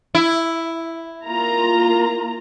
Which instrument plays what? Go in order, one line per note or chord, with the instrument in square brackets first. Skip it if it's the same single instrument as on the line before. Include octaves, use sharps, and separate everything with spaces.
[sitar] E4
[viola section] A#3 F4 A#5